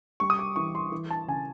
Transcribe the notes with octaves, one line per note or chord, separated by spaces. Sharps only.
G3 C#6
D#6
D6
E3 C#6
C6
E3
A5
C#3 G#5